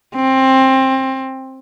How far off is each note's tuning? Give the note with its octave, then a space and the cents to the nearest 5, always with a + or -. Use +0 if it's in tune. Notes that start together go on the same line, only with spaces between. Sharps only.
C4 +20